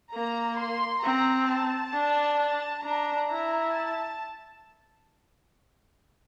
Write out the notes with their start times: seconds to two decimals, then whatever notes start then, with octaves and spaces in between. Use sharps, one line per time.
0.14 A#3 A#5
0.59 C6
1.04 C4 A#5
1.49 A5
1.94 D4
2.39 A5
2.84 D4 A#5
3.30 E4 A#5
3.74 A5